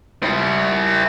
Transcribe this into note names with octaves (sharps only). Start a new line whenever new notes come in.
E4 C5